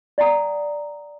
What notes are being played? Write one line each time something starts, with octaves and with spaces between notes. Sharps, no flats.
D5 F#5 G#5 A#5 D#6